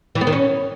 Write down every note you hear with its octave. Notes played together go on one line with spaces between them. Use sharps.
E3
B3
D#3
C#4